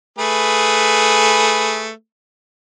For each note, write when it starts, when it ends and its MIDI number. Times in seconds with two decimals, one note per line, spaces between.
0.18 1.90 57
0.18 1.90 68
0.18 1.90 71